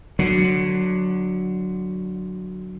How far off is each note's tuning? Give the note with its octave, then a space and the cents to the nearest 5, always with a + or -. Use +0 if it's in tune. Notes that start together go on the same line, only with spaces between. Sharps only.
D3 +20 F#3 +0